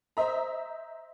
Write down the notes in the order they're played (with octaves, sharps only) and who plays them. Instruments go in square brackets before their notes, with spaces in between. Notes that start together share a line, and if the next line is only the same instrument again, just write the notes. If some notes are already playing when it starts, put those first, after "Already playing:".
[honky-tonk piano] C5 D#5 E5 A#5